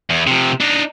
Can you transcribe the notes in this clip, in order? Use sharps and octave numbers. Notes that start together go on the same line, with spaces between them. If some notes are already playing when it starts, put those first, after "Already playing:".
E2
C3 F3
D4 D#4